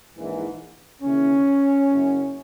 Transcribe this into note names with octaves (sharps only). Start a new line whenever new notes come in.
A#1 G#2 E3
D#2 C#3 E3 C#4
F#1 F#2 C#3